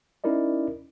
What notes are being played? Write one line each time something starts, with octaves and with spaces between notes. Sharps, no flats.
C#4 D#4 E4 A#4 D5 D#5